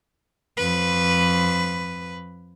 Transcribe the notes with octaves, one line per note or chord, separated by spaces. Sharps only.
F2 B4